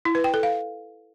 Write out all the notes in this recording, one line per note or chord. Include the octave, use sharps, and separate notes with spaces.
E4
B4
G5
A4
F5